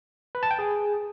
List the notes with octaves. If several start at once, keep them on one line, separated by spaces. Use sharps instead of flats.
B4
A5
G5
G#4